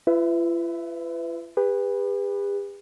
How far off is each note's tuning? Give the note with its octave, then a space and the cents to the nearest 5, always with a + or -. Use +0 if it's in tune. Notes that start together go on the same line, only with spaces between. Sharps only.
F4 -45 B4 +25 E5 +0
G4 +45 B4 +0